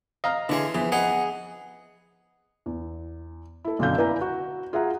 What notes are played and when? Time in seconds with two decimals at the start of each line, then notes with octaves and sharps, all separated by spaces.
0.24 D#5 F5 A#5 F6
0.49 D3 E3 D4 G#4 C#5 C6
0.75 F2 E3 B3 G#4
0.92 D#4 G#4 B4 F#5
2.66 E2
3.64 E4 A4
3.79 B1 F#2 B2 D3 F5 G6
3.98 E4 B4 D5 F5 G#5 A#5
4.21 F#4
4.73 F4 G#4 E5 F#5 A#5